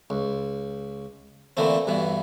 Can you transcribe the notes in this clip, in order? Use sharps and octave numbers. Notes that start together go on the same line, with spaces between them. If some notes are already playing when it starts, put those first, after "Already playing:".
C#2
A#2 D3 E3 A3 C4
G2 B2 E3